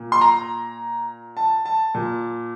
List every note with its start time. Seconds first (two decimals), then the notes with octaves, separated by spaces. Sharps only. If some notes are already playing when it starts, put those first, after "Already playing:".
Already playing: A#2
0.12 C6
0.21 A#5
1.37 A5
1.65 A5
1.94 A#2